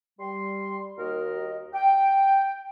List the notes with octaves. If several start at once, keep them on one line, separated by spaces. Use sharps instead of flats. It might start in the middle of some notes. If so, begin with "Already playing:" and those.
G3 C6
D#2 F#4 A#4 D#5
G5